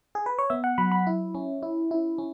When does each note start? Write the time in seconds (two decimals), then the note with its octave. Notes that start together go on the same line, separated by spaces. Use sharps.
0.15 G#4
0.26 B4
0.38 C#5
0.50 B3 E5
0.64 F#5
0.78 F#3 B5
0.92 B5
1.07 E4
1.35 C#4
1.63 E4
1.91 E4
2.18 C#4